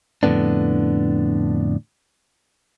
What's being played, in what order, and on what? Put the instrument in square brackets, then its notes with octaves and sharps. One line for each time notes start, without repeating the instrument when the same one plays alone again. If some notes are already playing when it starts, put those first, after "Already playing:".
[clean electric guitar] F2 A2 D3 B3 D4